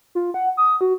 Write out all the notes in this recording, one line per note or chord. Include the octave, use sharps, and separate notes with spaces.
F4
F#5
D#6
F#4